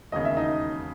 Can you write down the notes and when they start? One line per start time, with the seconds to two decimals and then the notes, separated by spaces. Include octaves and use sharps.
0.12 E1 D#2 C#3 D#5
0.25 E5
0.37 D#4 D#5